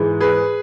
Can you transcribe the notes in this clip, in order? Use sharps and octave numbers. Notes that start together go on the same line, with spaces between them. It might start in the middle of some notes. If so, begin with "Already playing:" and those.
Already playing: G#2 E3 G#3
G#4 B4